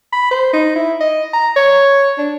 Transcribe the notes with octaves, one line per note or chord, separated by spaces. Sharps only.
B5
C5
D#4
E4
D#5
A#5
C#5
D4